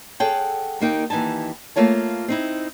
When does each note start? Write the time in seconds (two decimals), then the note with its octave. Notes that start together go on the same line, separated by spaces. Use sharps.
0.20 G#4 A4 C#5 F#5 G5 A5
0.80 D#2 A#3 D#4 G5
1.10 D#2 E3 D#4 G#5 A5
1.76 A3 A#3 F4 C#5 A5
2.28 C4 D#4 E4